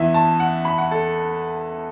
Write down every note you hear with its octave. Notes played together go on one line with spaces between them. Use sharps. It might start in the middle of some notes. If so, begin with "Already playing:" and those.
Already playing: E2 E3 B3 E5
A5
F#5
B5
F#5
A4